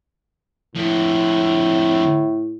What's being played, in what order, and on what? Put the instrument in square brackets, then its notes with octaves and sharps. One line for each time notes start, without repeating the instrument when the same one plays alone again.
[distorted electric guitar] F2 D3 [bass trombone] A2